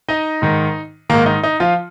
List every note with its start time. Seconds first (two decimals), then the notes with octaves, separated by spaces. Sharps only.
0.08 D#4 D#5
0.42 G#2 D#3
1.10 G#2 D#3 A#3 A#4
1.26 D#4
1.43 D#4
1.60 F3 F4